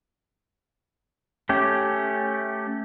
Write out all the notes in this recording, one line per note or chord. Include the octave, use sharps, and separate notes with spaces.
A3 C#4 G4